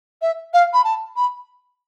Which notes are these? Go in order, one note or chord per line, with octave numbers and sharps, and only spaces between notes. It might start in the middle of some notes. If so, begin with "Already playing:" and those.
E5
F5
B5
A5
B5